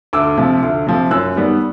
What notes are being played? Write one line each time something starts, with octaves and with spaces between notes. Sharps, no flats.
D2 D6 E6
C3 F3
D2
C3 F3
F#2 E6 F#6
D#3 G3 B3